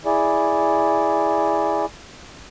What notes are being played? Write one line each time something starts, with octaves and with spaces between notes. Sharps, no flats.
E4 G#4 D5